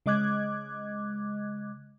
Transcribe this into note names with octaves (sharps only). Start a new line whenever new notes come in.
C#3 G#3 D#5 D6 F#6 G#6